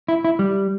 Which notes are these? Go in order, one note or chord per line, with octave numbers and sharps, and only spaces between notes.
E4
E4
G3